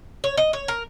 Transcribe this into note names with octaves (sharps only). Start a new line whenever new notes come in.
C#5
D#5
C#5
A#4